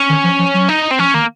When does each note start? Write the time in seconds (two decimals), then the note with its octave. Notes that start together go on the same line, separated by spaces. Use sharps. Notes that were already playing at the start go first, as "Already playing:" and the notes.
Already playing: C#4
0.09 D#3
0.24 F3
0.39 F3
0.54 F#3
0.69 D#4
0.91 C4
0.99 F3 C#4
1.14 D#3 A#3